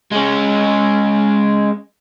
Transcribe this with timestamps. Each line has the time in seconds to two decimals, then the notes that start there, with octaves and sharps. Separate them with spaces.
0.11 G#3 C#4